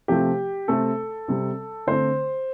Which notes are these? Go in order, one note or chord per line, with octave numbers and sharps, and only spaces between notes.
C3 F3 A3 C4 G4
C3 A3 C4 A4
C3 G3 C4
D3 A3 C4 C5